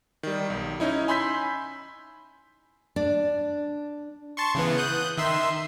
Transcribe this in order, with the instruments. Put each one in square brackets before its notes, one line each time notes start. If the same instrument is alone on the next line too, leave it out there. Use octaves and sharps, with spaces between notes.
[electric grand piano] D#3 G3
B1
C#4 D#4 E4
G#5 B5 C6 E6 G6 B6
[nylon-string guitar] D4
[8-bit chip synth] A5 C6 C#6
C#3 E3 B3
D#6 F#6 G6
D#3 E5 C6